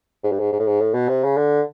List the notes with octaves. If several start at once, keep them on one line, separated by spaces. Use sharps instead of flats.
G#2
G2
G#2
G#2
A2
G#2
A2
B2
C3
C#3
D3